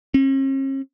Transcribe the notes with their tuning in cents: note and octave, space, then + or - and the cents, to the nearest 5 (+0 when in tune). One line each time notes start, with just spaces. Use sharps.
C#4 -45